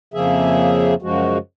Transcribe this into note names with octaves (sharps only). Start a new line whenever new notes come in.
F2 C#3 F3 A#3 G#4 E5
F#2 C#3 F3 G#3 F#4